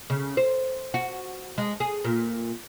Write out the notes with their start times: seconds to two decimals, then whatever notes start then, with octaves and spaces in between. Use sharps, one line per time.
0.10 C#3
0.37 C5
0.94 F#4
1.58 G#3
1.80 G#4
2.04 A#2